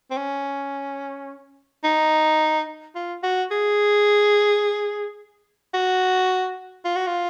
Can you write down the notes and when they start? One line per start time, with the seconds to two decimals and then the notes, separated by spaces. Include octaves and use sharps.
0.11 C4
0.17 C#4
1.84 D#4
2.95 F4
3.23 F#4
3.51 G#4
5.74 F#4
6.85 F4
6.96 F#4
7.07 F4